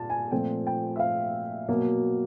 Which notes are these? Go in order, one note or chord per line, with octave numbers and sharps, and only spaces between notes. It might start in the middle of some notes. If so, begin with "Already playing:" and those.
Already playing: A#2 A5
G#5
A#2 F3 A3 C4 G5
G5
E5
F5
B2 F#3 A#3